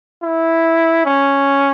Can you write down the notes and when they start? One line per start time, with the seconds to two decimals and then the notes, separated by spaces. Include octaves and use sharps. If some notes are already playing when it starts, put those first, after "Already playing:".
0.23 E4
1.06 C#4